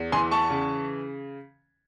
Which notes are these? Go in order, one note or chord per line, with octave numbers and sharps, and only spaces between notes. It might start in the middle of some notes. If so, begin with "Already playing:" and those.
Already playing: E2
E3 G#5 C6
A5 C#6
C#3